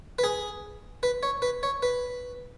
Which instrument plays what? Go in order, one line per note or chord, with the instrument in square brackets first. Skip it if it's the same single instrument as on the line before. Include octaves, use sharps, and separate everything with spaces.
[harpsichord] B4
G#4
B4
C#5
B4
C#5
B4